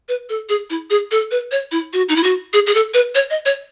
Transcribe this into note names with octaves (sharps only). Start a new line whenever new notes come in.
B4
A4
G#4
E4
G#4
A4
B4
C#5
E4
F#4
D#4
E4
F#4
G#4
G#4
A4
B4
C#5
D#5
C#5